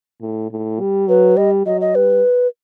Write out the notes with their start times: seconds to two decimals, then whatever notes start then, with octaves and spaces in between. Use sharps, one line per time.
0.21 A2
0.51 A2
0.80 G3
1.08 F#3 B4
1.36 G3 D#5
1.66 F#3 D#5
1.81 D#5
1.95 G3 B4